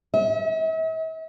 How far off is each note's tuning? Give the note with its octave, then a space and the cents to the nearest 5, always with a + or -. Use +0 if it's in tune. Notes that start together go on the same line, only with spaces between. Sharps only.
E5 -45